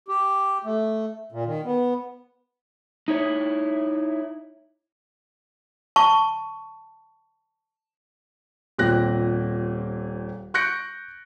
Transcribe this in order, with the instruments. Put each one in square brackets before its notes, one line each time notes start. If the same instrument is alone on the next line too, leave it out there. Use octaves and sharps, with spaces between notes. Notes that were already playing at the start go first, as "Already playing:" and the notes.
[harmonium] G4
A3
A#2
D#3
B3
[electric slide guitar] D#4 E4 C#5
[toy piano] A5 C#6
[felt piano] D#1 A#2 C4 G4 F#6 A#6
C#6 F#6 G6 A#6 C#7 D7